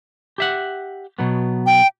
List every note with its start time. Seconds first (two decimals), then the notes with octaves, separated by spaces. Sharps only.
0.38 G4 E5 F#5
1.19 B2 F#3 B3
1.66 G5